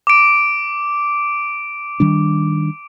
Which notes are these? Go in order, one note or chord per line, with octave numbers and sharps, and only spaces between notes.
D6 D7
D#3 G3 D4